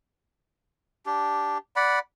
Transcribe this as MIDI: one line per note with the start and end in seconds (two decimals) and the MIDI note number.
1.06 1.58 62
1.06 1.58 67
1.76 1.99 74
1.76 1.99 78
1.76 1.99 83